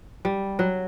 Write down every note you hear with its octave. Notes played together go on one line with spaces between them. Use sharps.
G3
F#3